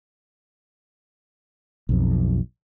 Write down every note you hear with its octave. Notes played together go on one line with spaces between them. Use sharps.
B1 F2